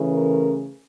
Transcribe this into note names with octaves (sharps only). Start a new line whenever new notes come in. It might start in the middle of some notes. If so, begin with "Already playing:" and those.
Already playing: C#3 E3 A3 C#4
A#4